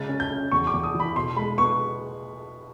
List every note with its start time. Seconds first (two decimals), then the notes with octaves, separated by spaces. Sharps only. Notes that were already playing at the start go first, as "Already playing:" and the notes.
Already playing: C#3 G#3 A6
0.09 C#4
0.20 G6
0.31 C#4
0.52 E2 C#6
0.67 D6
0.73 E2
0.83 D#6
0.94 E3
1.00 B5
1.15 B2 C6
1.37 G#3 B5
1.58 B3 C#6